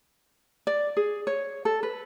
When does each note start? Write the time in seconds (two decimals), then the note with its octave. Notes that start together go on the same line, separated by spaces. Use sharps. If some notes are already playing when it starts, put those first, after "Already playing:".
0.67 D5
0.97 G#4
1.27 C#5
1.65 A4
1.83 B4